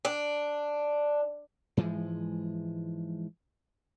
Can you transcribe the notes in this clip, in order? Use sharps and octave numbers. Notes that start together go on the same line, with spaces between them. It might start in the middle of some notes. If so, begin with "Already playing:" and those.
D4
G#2 E3 F3 G#3